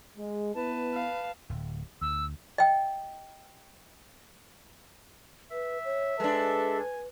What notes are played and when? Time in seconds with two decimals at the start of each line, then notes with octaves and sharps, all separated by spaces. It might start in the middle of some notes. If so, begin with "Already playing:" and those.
0.17 G#3
0.55 B3 E4 B4 A5
0.94 F5
1.50 D1
2.01 D2 E6
2.58 D#5 G5
5.51 B4 E5
5.84 C#5
6.20 G#3 D4 A4 B4
6.79 G#5